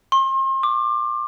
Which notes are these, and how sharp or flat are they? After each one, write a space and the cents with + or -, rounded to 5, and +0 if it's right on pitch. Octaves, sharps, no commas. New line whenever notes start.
C6 +40
D6 +20